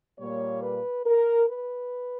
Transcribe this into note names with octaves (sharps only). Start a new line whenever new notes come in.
A#2 G3 A#3 C#5
B4
A#4
B4